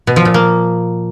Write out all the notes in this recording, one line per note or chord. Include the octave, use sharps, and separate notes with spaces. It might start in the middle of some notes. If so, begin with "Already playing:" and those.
B2
F3
A#2
A#3